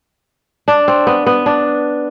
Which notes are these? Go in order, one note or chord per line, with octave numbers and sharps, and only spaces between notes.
D4
C4
B3
B3
D4